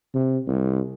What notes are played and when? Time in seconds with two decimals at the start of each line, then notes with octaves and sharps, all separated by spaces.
0.15 C3
0.48 C2